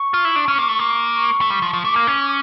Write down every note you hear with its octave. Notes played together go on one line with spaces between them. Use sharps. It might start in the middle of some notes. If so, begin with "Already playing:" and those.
Already playing: C#6
F4
E4
D4
C#4
A#3
A3
A#3
C#6
A3
G3
F3
F3
A3 D6
A#3
C#4